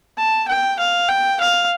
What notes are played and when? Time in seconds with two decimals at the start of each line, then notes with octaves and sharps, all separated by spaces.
0.18 A5
0.49 G5
0.80 F5
1.09 G5
1.41 F5